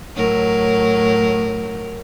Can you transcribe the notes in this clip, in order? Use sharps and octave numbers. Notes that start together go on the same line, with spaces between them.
A2 F#3 A#4